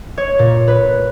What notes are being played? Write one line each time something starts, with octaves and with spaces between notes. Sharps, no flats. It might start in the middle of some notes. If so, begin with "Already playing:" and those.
C#5
A#2
B4